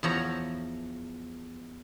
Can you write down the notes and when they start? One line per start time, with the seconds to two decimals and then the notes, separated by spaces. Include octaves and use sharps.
0.03 E2 F3 C#5 A#5